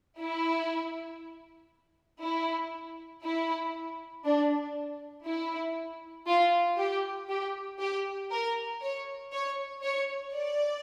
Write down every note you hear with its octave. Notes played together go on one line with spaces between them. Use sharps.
E4
E4
E4
D4
E4
F4
G4
G4
G4
A#4
C#5
C#5
C#5
D5